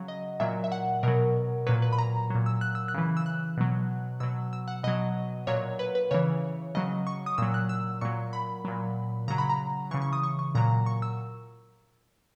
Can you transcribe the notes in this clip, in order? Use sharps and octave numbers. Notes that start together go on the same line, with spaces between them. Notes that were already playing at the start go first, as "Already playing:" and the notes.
Already playing: C#3 F#3
D#5
A#2 F#3 E5
E5
F#5
B2 F#3 A#4
A#2 F#3 B4
B4
B5
A#5
A#2 F#3
E6
F#6
E6
F#6
C#3 E3
E6
F#6
B2 F#3
B2 F#3 E6
E6
F#5
B2 F#3 D#5
A#2 F#3 C#5
B4
B4
C#3 E3 C#5
C#3 F#3 D#5
C#6
D#6
A#2 F#3 E6
F#6
E6
A#2 F#3 C#6
B5
A#2 F#3
C#3 F#3 A#5
B5
A#5
C#3 E3 C#6
C#6
D#6
C#6
C#6
A#2 F#3 A#5
C#6
E6